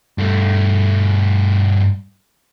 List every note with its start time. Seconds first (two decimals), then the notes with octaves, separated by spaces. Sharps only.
0.18 G2 A3